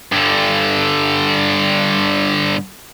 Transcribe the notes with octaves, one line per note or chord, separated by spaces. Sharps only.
G2 D3